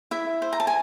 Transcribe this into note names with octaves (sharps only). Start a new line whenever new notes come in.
E4 E5
C5
A#5
A5
G#5